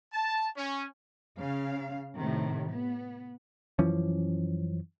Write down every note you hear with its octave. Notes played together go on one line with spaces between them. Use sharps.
A5
C#4
C#3 F5
A2 C3 D#3
B3
F#2 E3 F3 C#4